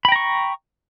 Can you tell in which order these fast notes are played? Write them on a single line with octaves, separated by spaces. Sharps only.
B5 G5 A#5 C#6